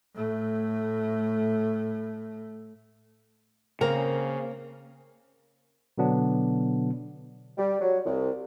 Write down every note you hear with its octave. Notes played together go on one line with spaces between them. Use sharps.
A2 A3
C#3 A#3 C4 A#4
B2 D3 F#3 B3 D4
G3
F#3
C2